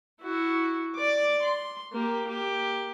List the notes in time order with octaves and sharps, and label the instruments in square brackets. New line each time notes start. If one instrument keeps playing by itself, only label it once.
[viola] E4 F#4
D5 D6
C6
A#3 G4
A#3 G4